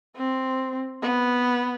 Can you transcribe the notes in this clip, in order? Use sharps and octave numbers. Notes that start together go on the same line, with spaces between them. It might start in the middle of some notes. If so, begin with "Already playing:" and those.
C4
B3